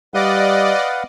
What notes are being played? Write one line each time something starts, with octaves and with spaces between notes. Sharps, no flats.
G3 B4 D5 D#5 F5 F#5